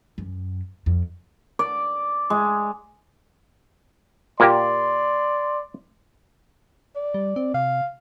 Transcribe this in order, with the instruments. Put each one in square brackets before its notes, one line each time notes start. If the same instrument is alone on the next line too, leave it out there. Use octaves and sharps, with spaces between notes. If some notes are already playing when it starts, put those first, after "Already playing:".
[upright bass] F#2
F2
[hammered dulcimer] D5
G#3
[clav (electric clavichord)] A#2 A#3 G4 [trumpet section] D5 C6
[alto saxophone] D5
[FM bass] G3
C4
[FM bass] C3 [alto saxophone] F5